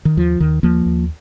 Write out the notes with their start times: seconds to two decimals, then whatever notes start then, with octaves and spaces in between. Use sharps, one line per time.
0.05 D#3
0.17 D#2 F3
0.40 D#2 D#3
0.63 D#2 F3 A#3
0.86 D#2